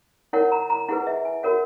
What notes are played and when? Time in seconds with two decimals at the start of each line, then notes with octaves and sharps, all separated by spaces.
0.33 E4 A#4 C#5 F#5
0.52 A#5
0.70 A#5
0.88 E4 G#4 B4 F#5
1.07 E5
1.25 G#5
1.43 F#4 A#4 C#5 F#5